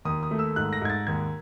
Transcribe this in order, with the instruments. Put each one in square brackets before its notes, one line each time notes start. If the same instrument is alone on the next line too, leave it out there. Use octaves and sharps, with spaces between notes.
[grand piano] D#2 D#6
D#6
A3
E6
G#2 F#6
A#6
G#2 G#6
A6
D#2 G#6